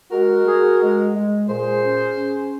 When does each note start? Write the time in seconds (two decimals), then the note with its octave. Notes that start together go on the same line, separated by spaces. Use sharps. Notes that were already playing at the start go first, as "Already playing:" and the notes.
0.12 G#3 F#4 A#4
0.47 G#4
0.82 G#3
1.16 G#3
1.49 A#2 G#4 C5
1.83 C#4
2.19 C#4